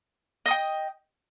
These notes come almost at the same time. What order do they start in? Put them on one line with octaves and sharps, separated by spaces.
D#5 D#6 G5